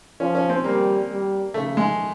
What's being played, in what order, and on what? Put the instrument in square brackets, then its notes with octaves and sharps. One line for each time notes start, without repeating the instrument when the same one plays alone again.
[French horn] F3 [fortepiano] C#4
[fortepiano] C#4
C4
[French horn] G3 [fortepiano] A#3
[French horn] G3
[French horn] C#3 [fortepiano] A3
[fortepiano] G#3